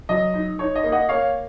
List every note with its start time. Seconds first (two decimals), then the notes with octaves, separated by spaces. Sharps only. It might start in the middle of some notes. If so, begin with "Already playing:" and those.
0.09 F#3 D#5
0.34 D#4
0.59 D#4 C#5
0.75 D#5
0.84 A#3
0.92 D#5 F#5
1.09 A#3 C#5 F5